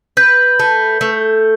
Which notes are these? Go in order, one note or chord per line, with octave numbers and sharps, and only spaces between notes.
B4 G6
A3
A3